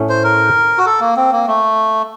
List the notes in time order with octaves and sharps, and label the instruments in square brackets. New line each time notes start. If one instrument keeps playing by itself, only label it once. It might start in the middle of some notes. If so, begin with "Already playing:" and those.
Already playing: [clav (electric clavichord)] A2 A3 C#4
[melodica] C5
A#4
F#4
A4
A#3
C4
A#3
A3